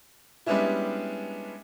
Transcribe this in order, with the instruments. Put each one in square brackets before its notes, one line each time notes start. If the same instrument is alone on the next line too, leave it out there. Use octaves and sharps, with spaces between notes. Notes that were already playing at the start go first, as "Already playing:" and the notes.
[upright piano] G3 G#3 B3 C#4 D4 E4